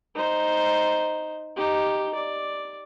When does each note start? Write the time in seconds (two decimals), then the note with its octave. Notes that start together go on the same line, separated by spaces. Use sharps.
0.15 D#4 C5
1.56 D#4 G4
2.14 D5